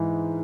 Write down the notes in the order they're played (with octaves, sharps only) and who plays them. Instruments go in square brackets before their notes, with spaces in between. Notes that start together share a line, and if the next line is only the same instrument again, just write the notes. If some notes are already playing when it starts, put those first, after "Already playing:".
Already playing: [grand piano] G#2 E3